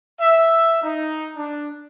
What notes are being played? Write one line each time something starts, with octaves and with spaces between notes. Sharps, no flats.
E5
D#4
D4